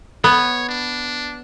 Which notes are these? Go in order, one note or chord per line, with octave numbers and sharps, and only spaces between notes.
B3 C#5
D4